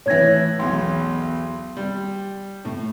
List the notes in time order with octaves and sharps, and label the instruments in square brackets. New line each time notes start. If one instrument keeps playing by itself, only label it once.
[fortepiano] A2 E3 [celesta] C#5 G#6 A#6
[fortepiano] B1 E2 [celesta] C6
[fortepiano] G3
A2